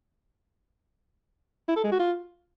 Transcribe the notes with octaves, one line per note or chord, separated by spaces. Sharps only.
E4
A4
G#3
F#4
F4